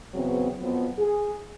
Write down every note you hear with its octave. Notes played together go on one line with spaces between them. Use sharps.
E2 C#3 F#3 B3 C4
F2 F3 F#3 B3
G#4